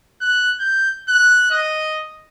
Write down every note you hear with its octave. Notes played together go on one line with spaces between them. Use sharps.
F#6
G6
F#6
D#5